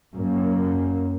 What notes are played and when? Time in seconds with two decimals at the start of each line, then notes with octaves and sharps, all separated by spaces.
0.15 F#2 A#3